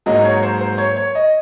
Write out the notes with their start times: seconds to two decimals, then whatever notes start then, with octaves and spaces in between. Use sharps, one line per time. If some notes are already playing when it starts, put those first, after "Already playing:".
0.06 G#2 F#3 A#3 D#5
0.24 C#5
0.43 C5
0.61 C5
0.78 C#5
0.97 C#5
1.15 D#5